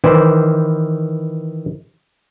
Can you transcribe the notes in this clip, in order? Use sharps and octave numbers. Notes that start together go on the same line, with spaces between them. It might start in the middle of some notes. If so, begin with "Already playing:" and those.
D#3 E3 B4 C5 D5